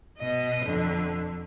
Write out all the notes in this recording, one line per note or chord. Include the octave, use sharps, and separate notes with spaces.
B2 D#5
F2 D3